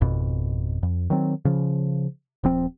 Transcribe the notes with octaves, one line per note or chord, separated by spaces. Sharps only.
G#1 F2 B2
F2
D#3 F#3 C4
C#3 F3
D#1 F3 C4